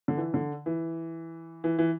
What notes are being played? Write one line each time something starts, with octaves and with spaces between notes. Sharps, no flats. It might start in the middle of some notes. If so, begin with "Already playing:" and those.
D3
E3
D3
E3
E3
E3